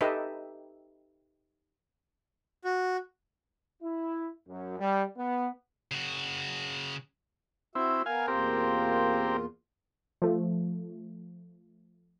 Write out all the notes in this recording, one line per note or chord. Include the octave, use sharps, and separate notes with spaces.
D#4 G4 A4 B4 D#5 E5
F#4
E4
F#2
G3
B3
C#3 F#4
C4 E4 F#4 E5
B3 A#4 F5 G#5
E2 A#2 C4 F4 G4 A#4
F3 A3